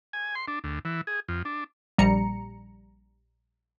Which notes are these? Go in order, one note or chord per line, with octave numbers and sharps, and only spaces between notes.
G#5
C6
D4
D2
E3
G#4
F2
D4
A#1 G3 A#5 C#7